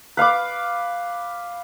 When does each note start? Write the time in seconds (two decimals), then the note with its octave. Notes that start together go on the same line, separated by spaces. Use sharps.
0.17 B4 F5 B5 D6